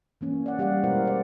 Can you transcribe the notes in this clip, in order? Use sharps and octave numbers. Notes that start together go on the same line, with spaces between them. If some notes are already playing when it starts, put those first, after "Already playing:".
E3 A#3 C#4
D5 F#5
G3 G4 D5 F5 F#5
B2 G#3 E4 A#4 C5 F#5
C5 D5